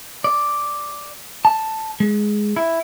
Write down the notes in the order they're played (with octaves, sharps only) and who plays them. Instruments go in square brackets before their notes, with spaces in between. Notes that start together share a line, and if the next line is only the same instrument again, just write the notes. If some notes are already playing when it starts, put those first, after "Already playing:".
[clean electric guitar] D5
A5
G#3
E4